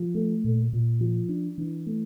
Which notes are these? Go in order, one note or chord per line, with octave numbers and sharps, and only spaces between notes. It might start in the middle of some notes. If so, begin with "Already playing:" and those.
Already playing: F3
A3
A#2
A#2
F3
D4
E3
A3